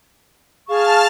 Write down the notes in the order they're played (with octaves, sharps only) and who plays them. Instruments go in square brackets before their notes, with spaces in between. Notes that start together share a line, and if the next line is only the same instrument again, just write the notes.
[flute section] G#4 F5 C#6 [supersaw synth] A5 F6